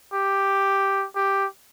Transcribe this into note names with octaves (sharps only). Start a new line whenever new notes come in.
G4
G4